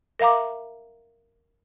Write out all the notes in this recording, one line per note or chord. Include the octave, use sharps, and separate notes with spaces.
A#4 E5 F5 A#5 D6